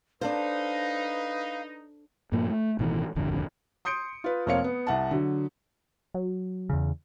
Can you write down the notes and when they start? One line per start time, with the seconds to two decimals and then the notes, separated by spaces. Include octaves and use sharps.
0.21 D4 D#4 A4 B4 C5 F5
2.32 G2 A#2 F3 A#3
2.50 A3
2.79 A1 B2 D#3 E3
3.15 D#1 G#1 F2 D3
3.85 C6 D#6 G6 C#7 D7
4.24 F4 B4
4.46 F1 A#3 C4 C#5 F5 C#7
4.64 B3
4.87 C2 F#5 A5
5.11 D3 F#3
6.14 F#3
6.70 E2 C#3